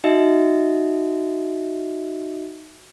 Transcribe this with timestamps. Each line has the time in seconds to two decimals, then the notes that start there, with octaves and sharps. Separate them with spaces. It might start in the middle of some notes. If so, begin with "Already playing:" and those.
0.04 D#4 F#4 D#5 E5